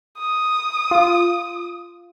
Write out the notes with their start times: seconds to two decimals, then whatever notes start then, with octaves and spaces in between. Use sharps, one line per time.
0.19 D#6
0.91 F4